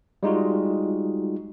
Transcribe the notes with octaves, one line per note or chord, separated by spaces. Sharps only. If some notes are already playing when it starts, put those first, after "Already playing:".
G3 G#3 D#4 F4 F#4